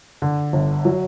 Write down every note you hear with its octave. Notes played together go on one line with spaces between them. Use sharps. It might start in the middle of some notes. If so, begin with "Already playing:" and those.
D3
G1
F#3